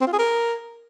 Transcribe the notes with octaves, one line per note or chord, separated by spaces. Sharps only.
C4
F4
G#4
A#4